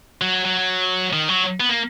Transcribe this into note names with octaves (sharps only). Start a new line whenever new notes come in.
F#3
F#3
D#3
F#3
B3
A#3